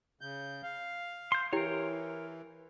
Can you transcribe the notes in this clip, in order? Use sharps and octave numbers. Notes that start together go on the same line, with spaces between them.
C#3 G6
F5
C6 G6
E3 E4 G4 A#4 C#5 G5